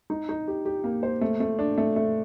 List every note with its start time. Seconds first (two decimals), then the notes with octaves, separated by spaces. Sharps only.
0.10 D#4
0.29 D#4
0.48 G4
0.65 G4
0.84 A#3
1.03 C5
1.21 A3
1.40 A3
1.59 D4
1.78 A3
1.96 A3